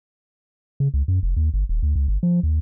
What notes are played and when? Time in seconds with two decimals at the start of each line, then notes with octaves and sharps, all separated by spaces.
0.80 C#3
0.94 C#2
1.08 F#2
1.23 F1
1.37 D#2
1.54 G1
1.69 D#1
1.83 D2
1.96 C#2
2.08 G1
2.23 F3
2.43 D#2